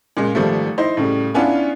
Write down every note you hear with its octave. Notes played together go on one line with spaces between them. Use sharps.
A#2 C#3 G#3
G#1 F3 G3 A3
D#4 E4 C5
A2 C#3 G3
B3 C#4 D4 E4 F4